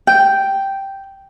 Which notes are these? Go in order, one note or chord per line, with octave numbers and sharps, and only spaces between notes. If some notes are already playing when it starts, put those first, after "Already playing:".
G5